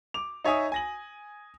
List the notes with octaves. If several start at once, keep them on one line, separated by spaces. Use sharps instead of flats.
D6 F7
D#4 C#5 E5 G#5 D#6
G#5 A#6 F#7